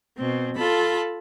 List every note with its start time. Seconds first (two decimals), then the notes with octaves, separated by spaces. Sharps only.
0.17 B2 C4
0.57 F4 A4 A5 B5